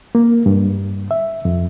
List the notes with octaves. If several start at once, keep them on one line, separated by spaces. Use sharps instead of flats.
A#3
G2
E5
F2